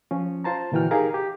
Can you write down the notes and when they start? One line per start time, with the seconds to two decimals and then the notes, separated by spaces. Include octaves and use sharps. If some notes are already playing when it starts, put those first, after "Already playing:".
0.11 F3 C#4
0.44 F4 C5 A5 A#5
0.72 A#2 D3 E3 F#4 G5 F6
0.91 D#4 G4 G#4 A#4 F5 A#5
1.14 G4